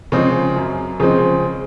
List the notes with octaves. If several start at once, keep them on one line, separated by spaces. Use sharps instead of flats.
C#3 F3 G#3 C4
F#2
C#3 F3 G#3 C4